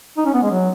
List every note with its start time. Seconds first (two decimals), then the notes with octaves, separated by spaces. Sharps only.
0.18 D#4
0.26 C#4
0.34 B3
0.43 G#3
0.51 F#3